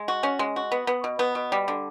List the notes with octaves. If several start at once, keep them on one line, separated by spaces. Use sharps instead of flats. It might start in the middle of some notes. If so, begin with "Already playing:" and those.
Already playing: G#3
F#4
C#4
G#3
F#4
B3
B3
B2
B3
B2
G3
D3